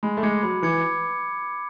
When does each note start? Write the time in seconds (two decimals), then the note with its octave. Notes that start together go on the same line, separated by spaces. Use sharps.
0.03 G#3 B5
0.17 A3
0.23 G#3 D6 G#6 C#7
0.43 F#3 B5
0.62 E3 D6 G#6 C#7